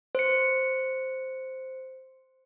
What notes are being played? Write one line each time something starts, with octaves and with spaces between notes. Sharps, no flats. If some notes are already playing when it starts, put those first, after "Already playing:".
C5 C#7